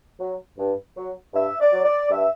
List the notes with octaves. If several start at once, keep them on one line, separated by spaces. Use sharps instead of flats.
F#3
G2
F#3
G2 E5
D5
F#3
D5
G2 E5